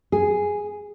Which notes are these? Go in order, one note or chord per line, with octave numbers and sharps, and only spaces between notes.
G#4